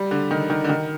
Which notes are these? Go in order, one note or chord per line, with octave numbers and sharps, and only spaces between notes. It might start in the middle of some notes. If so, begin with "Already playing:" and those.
Already playing: G3
D3
D#3
D#3
D3
D#3